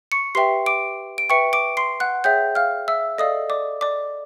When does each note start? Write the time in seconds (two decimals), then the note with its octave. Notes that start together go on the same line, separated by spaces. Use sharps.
0.12 C#6 C#7
0.35 G4 B4 E5 G5 C6 C7
0.66 D6 D7
1.18 D7
1.29 B4 E5 G5 C#6 C#7
1.53 D6 D7
1.77 C6 C7
2.00 F#5 F#6
2.24 G#4 C#5 E5 G5 G6
2.55 F5 F6
2.88 E5 E6
3.18 A4 D5 D#5 F5 D#6
3.50 D5 D6
3.81 D5 D6